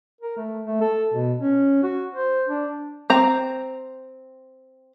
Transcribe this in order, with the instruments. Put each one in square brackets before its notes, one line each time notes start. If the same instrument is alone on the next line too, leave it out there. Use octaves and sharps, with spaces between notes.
[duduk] A#4
A3
A3
A4
B2
C#4
F#4
C5
D4
[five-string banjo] C4 A#5